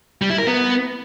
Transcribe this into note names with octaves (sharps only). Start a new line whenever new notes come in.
G3
E4
A#4
B3